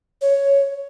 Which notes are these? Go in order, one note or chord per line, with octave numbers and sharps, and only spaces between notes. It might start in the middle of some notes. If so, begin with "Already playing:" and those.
C#5